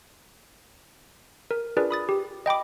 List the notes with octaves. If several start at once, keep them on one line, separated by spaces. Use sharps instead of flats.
A#4
D4 F4 G#4 A#4 B4 D5
B5 D#6 A6
G4
D#5 G5 B5 D6